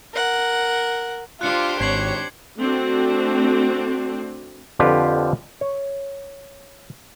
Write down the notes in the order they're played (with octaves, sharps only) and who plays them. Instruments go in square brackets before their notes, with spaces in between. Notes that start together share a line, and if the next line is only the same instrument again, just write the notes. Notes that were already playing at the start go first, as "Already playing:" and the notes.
[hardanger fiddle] A#4 F#5
[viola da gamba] D4 G4 C5 [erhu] F4 [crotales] F#6 C#7
[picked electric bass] G#1 [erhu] C#5 [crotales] G#6 C7 F#7
[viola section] A3 C4 D4 F#4
[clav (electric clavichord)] F2 D3 F3 F4 G4 B4
C#5